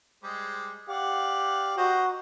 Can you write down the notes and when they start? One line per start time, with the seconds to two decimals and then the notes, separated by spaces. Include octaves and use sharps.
0.24 G3 G#3 C5
0.89 G4 D5 F5 F#5
1.77 F#4 C5 D#5 A#5